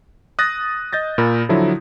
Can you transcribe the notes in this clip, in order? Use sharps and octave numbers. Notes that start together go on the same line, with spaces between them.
D#6 F#6 A6 A#6
D#5 G6 A6 A#6
A#2 A#4 B5
D3 F3 F#3 E4